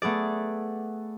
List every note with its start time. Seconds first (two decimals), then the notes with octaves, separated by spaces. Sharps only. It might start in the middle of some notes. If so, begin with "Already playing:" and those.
0.02 A3 B3 G#4 D5